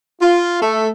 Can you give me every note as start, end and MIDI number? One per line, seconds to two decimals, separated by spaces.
0.22 0.62 65
0.62 0.89 57